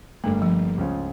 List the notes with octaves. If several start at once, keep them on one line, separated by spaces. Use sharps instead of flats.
G1 G2 D3 G3 A3 A#3
F3
C#2 C#3 F3 C#4 F4